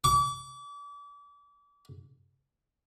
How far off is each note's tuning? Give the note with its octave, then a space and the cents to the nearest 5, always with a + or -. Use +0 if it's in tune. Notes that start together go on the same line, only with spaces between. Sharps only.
D6 -35